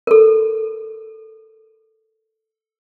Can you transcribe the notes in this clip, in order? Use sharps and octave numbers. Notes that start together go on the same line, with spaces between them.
A4 A#4